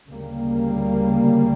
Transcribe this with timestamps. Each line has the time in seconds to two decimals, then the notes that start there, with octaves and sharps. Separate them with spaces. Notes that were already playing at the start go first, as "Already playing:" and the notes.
0.13 D2 C#3 G3 A#3